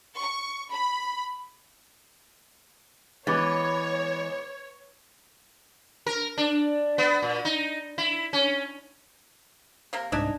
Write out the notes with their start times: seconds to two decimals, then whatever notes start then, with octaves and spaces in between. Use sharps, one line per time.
0.18 C#6
0.72 B5
3.27 E3 G#3 B3 C#5 D6 A6
6.06 A#4
6.38 D4
6.98 B3
7.22 A#2
7.45 D#4
7.98 E4
8.33 C#4
9.93 C3 A#3 A#4
10.12 C2 G#2 C3 D4 D#4 E5 G#5